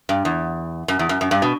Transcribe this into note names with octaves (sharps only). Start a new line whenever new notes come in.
G2
E2
F#2
E2
F#2
F#2
G2
B2